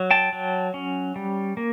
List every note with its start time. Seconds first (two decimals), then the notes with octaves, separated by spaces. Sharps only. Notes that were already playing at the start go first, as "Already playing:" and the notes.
Already playing: F#3
0.11 G5 A5
0.33 F#3
0.74 C#4
1.16 G3
1.57 A#3